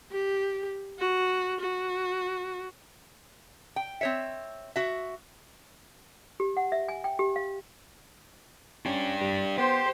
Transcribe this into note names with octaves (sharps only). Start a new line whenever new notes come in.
G4
F#4
F#4
G5
C4 C#5 E5
F#4 E5
G4
F#5
E5
G#5
G5
G4
F5
C#4 D4 G4
G3
B3 G4 C5